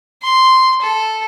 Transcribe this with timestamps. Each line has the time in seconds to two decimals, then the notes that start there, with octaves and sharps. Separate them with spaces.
0.23 C6
0.82 A4